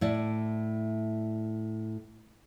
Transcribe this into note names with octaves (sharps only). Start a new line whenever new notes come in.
A2 E4 D5